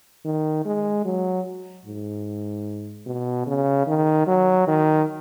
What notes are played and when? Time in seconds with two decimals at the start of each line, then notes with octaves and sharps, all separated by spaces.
0.25 D#3
0.65 G#3
1.05 F#3
1.85 G#2
3.06 B2
3.47 C#3
3.87 D#3
4.27 F#3
4.67 D#3